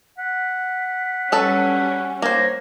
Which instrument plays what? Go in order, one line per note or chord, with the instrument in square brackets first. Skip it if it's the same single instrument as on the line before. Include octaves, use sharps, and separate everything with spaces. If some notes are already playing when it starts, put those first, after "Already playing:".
[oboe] F#5 [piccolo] B6
[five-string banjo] F#3 A4 B4 [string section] G3 C#4
[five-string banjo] A#3 C5 [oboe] C#5 [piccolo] A#6